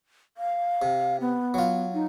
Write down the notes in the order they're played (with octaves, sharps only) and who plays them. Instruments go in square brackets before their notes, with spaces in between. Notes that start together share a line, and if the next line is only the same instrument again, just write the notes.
[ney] F5
[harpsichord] C3
[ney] B3
[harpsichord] F#3 F4
[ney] D#4